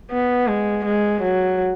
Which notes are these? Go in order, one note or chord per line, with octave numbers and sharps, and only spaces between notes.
B3
G#3
G#3
F#3